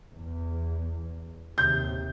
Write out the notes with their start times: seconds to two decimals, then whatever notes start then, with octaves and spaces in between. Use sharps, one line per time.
0.13 E2
1.58 D#2 C3 G6